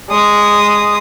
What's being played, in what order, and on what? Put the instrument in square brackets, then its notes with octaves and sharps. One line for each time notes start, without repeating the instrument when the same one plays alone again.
[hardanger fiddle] G#3 D#6